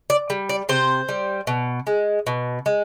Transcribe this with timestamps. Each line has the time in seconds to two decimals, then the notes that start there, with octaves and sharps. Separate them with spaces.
0.10 D5
0.30 G3
0.49 D5
0.69 C3 C5
1.09 G3
1.47 B2
1.87 G#3
2.27 B2
2.66 G#3